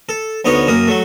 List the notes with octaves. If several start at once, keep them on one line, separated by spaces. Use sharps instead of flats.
A4
D2 B3 D#4 C#5
F#2 A#3 D#6
F#3 A3